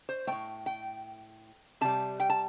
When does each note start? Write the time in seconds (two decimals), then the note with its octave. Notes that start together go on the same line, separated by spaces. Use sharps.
0.09 C5
0.27 A2 A3 G5
0.66 G5
1.81 C3 G3 A5
2.20 G5
2.30 A5